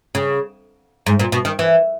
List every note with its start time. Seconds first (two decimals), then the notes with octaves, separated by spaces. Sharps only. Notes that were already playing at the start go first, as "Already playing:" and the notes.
0.15 C#3
1.06 G#2
1.19 A#2
1.32 B2
1.45 D#3
1.59 E3